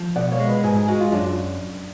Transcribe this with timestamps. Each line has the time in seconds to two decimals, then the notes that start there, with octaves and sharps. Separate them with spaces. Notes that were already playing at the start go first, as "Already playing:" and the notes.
Already playing: F3
0.16 B2 D5 F#5
0.32 C#5 F5
0.40 G#3
0.48 B4
0.64 G#2 G#4
0.76 G#4
0.88 G#3 F#4
1.00 F4
1.12 F#2 D4